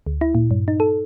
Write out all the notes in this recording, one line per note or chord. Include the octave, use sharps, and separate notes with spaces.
D2
E4
A#2
G2
D#4
A4